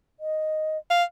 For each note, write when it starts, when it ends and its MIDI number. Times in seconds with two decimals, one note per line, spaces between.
0.20 0.78 75
0.91 1.03 77